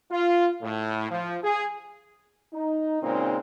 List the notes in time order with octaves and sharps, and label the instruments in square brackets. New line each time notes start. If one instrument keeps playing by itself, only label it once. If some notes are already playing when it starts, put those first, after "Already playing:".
[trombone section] F4
A2
F3
G#4
[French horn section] D#4
A#2 C#3 G#3 C4 D#4